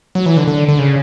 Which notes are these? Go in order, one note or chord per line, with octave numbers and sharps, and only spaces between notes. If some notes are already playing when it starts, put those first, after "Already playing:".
F#3
E3
D3
D3
D3
C#3